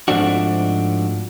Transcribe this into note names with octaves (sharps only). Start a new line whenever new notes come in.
G#2 F3 A3 C4 D4 F#4